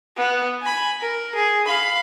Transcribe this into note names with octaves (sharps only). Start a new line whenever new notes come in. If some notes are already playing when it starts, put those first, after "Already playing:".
B3
G#5 B5
A#4
G#4
F5 B5